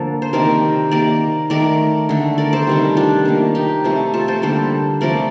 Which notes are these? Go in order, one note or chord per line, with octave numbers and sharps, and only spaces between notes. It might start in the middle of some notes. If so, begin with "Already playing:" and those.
Already playing: D3 F3 A#3 A4
C5
C3 D#3 A#3 A#4 D5
D#3 A#3 A#4 D5
D#3 A3 A#4 D5
D3 A3
A#4 D5
A4 C5
C3 D#3 G3
D4 F4
D#3 A#3
D#4 G4
C3 F3 A3
F4 A4
A4 C5
D3 G3 A#3 A4 C5
C3 F3 A3 A#4 D5